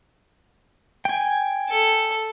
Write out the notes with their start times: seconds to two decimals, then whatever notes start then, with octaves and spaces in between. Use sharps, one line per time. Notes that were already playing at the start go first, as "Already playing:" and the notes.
1.05 G5 G#5
1.69 A4